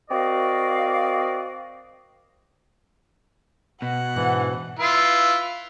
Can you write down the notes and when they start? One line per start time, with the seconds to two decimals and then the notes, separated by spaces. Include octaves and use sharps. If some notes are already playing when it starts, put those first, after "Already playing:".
0.10 C4 F#4 A#4 D5 D#5 F5
3.82 B2 F#5
4.16 G#2 E3 D4
4.79 E4 F4 B4